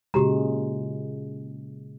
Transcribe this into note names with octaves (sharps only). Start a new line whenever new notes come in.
A#2 C#3 G#3 F#4 G4 A#5